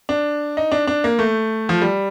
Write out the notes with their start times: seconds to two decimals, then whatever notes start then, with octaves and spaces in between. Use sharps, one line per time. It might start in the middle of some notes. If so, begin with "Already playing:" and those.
0.09 D4
0.57 D#4
0.72 D4
0.87 D4
1.04 A#3
1.19 A3
1.69 F3
1.82 G3